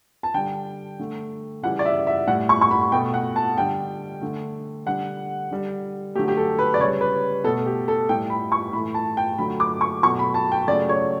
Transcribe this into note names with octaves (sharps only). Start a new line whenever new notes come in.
A5
D3 G3 G5
D3 A3
C#3 E3 G3 F#5
D5
E5
E5
A2 G3 F#5
C#6
C#6
B5
B2 A3 G5
F#5
A5
D3 G3 G5
D3 A3
D3 G3 F#5
D3 G3
D3 F#3 A3 G4
G4
A4
B4
D5
C#3 G3 C#5
B4
B2 A3 A4
G4
A4
A2 G3 G5
B5
C#6
A2 E3 A3 B5
A5
G5
D3 F#3 A3 B5
D6
C#6
B2 F#3 A3 C#6
B5
A5
G5
C#3 F#3 A3 D5
C#5